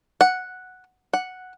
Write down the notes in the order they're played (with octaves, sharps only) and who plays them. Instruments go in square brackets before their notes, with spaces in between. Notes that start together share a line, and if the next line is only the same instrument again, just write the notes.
[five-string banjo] F#5
F#5